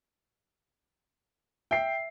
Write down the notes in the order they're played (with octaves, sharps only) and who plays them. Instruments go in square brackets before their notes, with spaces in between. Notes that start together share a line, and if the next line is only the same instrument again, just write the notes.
[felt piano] E5 C7 [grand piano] G5